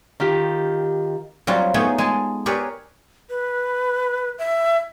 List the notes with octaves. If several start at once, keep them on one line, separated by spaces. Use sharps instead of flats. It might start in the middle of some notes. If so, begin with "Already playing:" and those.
D#3 F4 G4
F#3 G3 C4 F4 F#4
A3 B3 D#4 G#4 C#5 G5
G#3 G#5 A5
G4 G#4 A#4 B4 C#5 D5
B4
E5